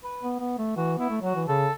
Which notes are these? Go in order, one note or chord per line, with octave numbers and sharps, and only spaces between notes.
B4
B3
B3
A3
E3 F#4
B3 E4
A3
F#3 F#4
E3
C#3 A4